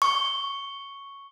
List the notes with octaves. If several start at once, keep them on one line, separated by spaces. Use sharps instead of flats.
C#6